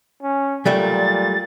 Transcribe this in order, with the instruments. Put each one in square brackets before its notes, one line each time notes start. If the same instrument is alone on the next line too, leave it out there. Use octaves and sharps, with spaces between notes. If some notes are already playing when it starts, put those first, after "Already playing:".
[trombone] C#4
[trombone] A#2 [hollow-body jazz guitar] F#3 G3 A3 [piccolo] A6